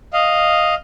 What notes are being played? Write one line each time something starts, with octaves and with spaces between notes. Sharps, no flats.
D#5 F5